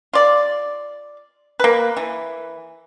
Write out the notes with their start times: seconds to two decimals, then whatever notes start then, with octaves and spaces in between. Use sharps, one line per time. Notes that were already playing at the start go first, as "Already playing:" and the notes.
0.13 F4 D5
1.60 A#3 B4
1.97 E3